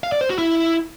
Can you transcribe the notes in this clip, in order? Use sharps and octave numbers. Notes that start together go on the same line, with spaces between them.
F5
D5
C5
F#4
E4